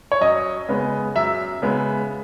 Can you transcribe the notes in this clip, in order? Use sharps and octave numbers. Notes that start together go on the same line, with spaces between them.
C#5
F#2 D#5
C#3 G#3 B3
F#2 E5
C#3 G#3 B3